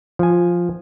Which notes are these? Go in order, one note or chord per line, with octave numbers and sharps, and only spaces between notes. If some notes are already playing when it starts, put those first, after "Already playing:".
F3 G#5